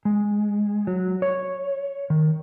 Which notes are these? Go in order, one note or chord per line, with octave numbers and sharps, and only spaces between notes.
G#3
F#3
C#5
D#3